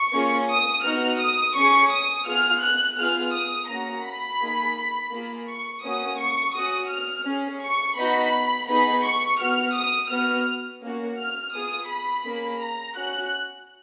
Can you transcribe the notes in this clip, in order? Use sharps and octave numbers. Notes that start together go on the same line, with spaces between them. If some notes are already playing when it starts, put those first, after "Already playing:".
Already playing: C#6
A#3 C#4 F4 G#4
D#6
B3 D#4 F#4 F6
D#6
C#4 G#4 C#6
D#6
B3 F4 G#4 F6
F#6
B3 F4 G#4 F6
D#6
A#3 C#4 F#4 A#5
B5
A#3 D#4 G#4
A#3 F4 G#4
C#6
A#3 C#4 F#4 D#6
C#6
C#4 F#4 D#6
F6
C#4 G#4
C#6
B3 D#4 F#4 B5
B3 D#4 G#4 B5
C#6
B3 F#4 F6
D#6
B3 F#4 F6
A#3 C#4 F#4
F6
B3 F4 G#4 D#6
B5
A#3 C#4 G#4
A#5
C#4 F#4 F#6